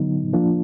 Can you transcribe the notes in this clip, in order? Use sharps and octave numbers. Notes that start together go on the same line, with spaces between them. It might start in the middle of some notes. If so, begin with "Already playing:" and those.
Already playing: D3 F#3 B3 D#4
F3 A#3 D4 F4